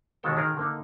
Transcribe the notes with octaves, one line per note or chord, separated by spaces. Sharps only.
D#2 B2 D#3 G#3 A4 G5
D#3 G#3 G#4 A#4
D3 A#3 D#4